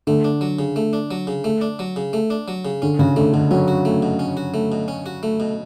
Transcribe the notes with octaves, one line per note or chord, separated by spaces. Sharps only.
D3 A3
D4
F#3
C#3
A3
D4
F#3
C#3
A3
D4
F#3
C#3
A3
D4
F#3
C#3
D3 C#4
C#3 F#4
D3 A3
B2 D3
F#3 C#4
F#4
A3
B2
C#4
F#4
A3
B2
C#4
F#4
A3
B2